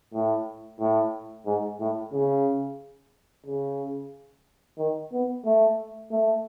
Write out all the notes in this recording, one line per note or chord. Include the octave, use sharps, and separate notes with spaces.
A2
A2
G#2
A2
C#3
C#3
D#3
B3
A3
A3